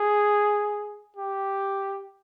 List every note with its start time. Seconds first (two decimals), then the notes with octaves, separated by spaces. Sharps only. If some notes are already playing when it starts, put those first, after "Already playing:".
Already playing: G#4
1.16 G4